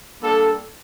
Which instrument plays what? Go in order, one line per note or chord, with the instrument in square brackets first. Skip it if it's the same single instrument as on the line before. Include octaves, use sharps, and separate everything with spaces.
[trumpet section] G3 A#3 D4 A4